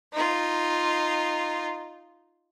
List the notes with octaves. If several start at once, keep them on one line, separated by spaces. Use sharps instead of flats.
D#4 F4